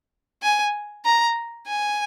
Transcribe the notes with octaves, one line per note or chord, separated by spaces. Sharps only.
G#5
A#5
G#5